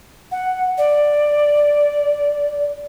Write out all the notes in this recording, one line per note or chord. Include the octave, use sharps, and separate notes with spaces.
F#5
D5